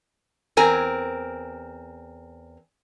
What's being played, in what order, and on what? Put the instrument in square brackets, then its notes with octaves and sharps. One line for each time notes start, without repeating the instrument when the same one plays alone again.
[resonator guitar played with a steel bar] E2 C4 A#4 G#5